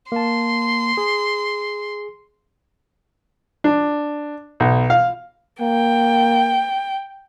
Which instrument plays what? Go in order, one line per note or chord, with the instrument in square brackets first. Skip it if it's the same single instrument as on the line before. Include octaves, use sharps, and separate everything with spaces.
[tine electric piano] A#3 A5 [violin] C6
[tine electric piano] G#4
[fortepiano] D4
B1
F5
[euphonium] A#3 [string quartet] G5